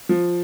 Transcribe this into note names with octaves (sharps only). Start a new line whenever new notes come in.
F3